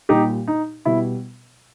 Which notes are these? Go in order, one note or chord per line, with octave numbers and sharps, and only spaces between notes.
A#2 G3 D#4 G4
D#4
B2 G3 E4